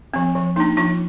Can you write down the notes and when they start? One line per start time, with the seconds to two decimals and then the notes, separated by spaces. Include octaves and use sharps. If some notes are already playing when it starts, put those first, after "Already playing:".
0.14 F3 C4
0.35 F3
0.56 A#3 D#4
0.60 D4
0.77 F3 D4 F4